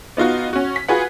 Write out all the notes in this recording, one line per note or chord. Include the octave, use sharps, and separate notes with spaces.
B3 D#4 F4 F#4
C#4 F#4
B6
F4 F#4 G#4 B4 F#5